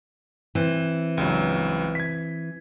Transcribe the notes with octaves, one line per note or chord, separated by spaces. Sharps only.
E3 C4
C#2 G2 F#3
G#6 B6